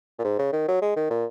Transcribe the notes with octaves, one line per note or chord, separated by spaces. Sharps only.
A#2
G#2
C#3
D#3
F#3
G#3
D#3
A#2